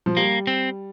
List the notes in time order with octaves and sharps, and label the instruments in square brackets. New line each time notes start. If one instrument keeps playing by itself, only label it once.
[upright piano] F3
[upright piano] G3 [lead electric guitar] A#3
[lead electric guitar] C4